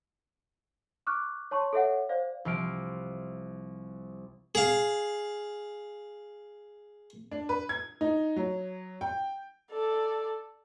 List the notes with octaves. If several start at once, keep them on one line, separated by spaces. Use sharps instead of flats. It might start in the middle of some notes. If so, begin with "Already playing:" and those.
C#6 D6 F6 F#6
C#5 A5 C6 C#6
A4 C#5 E5 F#5
C5 D5 F5
C2 F3 F5 D7
G#4 F5
D4
B4
G#6
D#4
F#3
G5
A4 D5